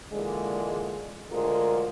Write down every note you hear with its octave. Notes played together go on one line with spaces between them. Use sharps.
A#2 D3 E3 G#3
D2 D3 G#3 F4 A#4